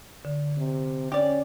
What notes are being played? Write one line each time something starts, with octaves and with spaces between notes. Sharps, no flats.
D3
C3
C#4 G4 D5